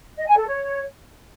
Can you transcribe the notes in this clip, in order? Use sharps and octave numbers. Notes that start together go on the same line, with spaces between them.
D#5
G#5
A4
C#5